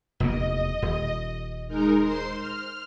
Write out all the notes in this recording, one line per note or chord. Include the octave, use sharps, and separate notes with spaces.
F1 E2 A#3 D#5
D#1
G#3 D#4 A#4
C5 C6
F6